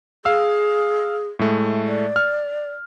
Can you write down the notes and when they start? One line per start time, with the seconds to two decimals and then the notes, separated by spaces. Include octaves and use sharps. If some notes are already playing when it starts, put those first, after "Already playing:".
0.25 G#4 F5 E6
1.39 A2 G#3 A3
1.87 D5
2.16 F6